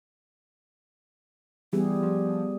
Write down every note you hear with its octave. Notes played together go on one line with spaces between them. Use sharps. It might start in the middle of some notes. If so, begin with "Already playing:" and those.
E3 G3 B3 G4 G#4
F3